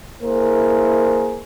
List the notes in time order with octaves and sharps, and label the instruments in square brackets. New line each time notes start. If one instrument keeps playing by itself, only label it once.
[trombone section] A#3 E4 G#4 A#4 C5